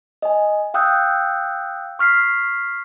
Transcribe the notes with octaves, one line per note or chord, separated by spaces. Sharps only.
D#5 G#5
F5 G5 D#6 E6 F#6 G6
C#6 F6 B6 C7